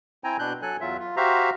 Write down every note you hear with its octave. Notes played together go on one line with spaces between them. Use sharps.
C4 E4 G5 G#5 A#5
B2 D4 F#6 G6
F#3 A4 G#5 F#6
E2 F#3 F4 E5
F4
F#4 G4 C5 E5 F5 A#5